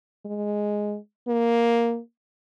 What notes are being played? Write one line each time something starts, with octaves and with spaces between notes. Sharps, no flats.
G#3
A#3